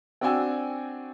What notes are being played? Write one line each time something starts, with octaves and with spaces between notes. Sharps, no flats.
C4 D4 F#4 G5 G#5 E6